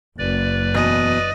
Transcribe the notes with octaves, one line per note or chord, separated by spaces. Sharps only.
F#1 B4 D5
E2 B2 D#5